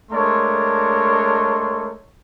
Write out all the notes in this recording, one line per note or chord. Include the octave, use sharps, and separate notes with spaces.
G#3 A3 D4 A#4 C#5 C6